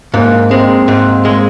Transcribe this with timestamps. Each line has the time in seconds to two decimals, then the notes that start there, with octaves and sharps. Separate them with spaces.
0.14 G#2 A#3
0.50 G#3 C4
0.88 G#2
1.25 G#3